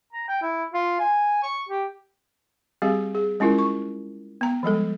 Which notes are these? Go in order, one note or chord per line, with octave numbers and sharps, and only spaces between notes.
A#5
G5
E4
F4
G#5
C#6
G4
G3 C4 G4 G#4 F5
G#4
G#3 C#4 E4 F4 A#4
C#6
B3 A#5
F3 G3 G#3 A4